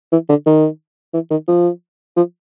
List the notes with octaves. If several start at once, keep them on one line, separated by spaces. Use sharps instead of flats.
E3
D3
D#3
E3
D#3
F3
F3